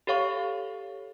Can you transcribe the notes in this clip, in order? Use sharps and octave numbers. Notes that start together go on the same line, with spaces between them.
G4 A4 C#5 F5 C#6